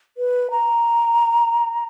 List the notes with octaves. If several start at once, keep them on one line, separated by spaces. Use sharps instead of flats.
B4
A#5